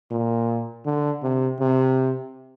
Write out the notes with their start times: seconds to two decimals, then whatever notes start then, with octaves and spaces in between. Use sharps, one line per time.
0.11 A#2
0.86 D3
1.23 C3
1.60 C3